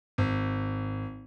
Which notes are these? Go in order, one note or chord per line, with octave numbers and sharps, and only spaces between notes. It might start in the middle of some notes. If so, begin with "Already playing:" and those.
G#1